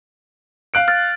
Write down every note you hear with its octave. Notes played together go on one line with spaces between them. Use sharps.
F5 F#6 D7
F6 A6